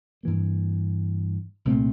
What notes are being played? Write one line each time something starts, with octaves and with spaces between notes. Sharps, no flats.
G2 E3 A#3
C2 A#2 A3 C4